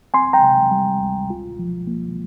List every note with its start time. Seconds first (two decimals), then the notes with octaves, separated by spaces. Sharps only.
0.14 C4 G#5 C6
0.33 G5 A#5
0.42 C3
0.71 G3
1.00 C#2
1.30 F4
1.59 F3
1.87 A#3